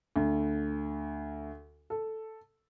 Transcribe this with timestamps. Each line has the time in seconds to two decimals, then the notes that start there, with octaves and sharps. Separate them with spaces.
0.16 D2
1.90 A4